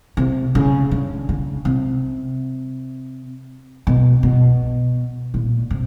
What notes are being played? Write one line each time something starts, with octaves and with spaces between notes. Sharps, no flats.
C3
C#3
D3
C#3
C3
B2
B2
A#2
C3